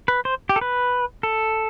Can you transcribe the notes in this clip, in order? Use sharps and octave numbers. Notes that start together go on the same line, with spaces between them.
B4
C5
G4
A4
B4
A4